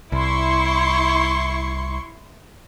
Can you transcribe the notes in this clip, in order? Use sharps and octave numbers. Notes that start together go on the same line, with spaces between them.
C2 E4 C6 C#6